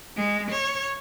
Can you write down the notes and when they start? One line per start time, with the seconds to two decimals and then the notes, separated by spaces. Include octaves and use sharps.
0.17 G#3
0.51 C#5